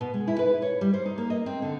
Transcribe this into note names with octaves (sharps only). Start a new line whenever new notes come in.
B2
G#3
E4
B4
C#5
G3
C5
D#4
A#3
D#5
C4
D3